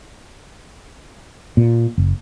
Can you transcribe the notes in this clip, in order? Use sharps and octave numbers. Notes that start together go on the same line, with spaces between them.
A#2
F#1